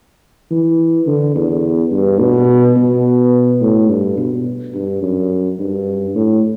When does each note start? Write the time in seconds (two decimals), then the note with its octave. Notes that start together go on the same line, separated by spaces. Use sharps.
0.51 E3
1.06 D3
1.35 E2
1.92 G2
2.20 B2
2.76 B2
3.61 A2
3.89 G2
4.17 B2
4.74 G2
5.02 F#2
5.59 G2
6.15 A2